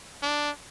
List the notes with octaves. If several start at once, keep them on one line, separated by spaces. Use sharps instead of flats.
D4